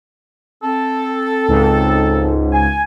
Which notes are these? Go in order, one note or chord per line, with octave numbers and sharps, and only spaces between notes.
C4 A4
C#2 G#2
G#5